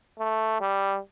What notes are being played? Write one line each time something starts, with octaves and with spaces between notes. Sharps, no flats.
A3
G3